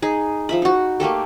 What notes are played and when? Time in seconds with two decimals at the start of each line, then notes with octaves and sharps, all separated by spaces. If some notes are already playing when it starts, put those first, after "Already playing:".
0.02 D#4 G#4
0.49 F3 E5 B5
0.62 D#4 F#4
1.00 A3 A#3 G4 A4